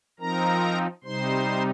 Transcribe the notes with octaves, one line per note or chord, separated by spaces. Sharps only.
F3 C4 D#4 A#4 A#5
C3 G3 D#4 C5 C6